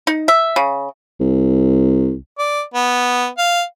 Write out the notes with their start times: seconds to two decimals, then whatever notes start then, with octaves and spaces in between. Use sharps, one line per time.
0.07 D#4
0.28 E5
0.56 C#3
1.20 C2
2.39 D5
2.74 B3
3.38 F5